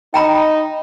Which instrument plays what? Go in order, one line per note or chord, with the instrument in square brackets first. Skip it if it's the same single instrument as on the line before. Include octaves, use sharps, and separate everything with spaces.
[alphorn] D#4 [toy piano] G5 A#5 B5